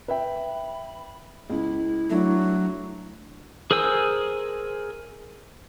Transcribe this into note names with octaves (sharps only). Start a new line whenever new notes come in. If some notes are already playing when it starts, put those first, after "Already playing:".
B4 E5 G5 B5
C#2 E4
F#3 A3 D4
G#4 A#4 C5 G#5 E6